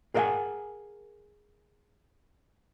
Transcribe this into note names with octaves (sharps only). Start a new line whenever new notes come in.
G#4 A#4 D5 F5 F#5 G#5